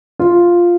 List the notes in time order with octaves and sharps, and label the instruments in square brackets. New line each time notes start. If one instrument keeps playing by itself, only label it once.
[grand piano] F4